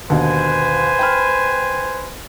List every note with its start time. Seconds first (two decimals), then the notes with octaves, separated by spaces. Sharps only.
0.10 D#2 B2 D3 B4 C5 G#5
0.99 G5 B5 F6